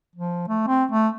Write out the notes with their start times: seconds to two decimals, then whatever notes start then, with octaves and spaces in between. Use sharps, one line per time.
0.16 F3
0.48 A3
0.67 C4
0.92 A3